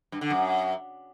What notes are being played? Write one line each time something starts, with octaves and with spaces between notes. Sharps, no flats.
G2
D3
F#2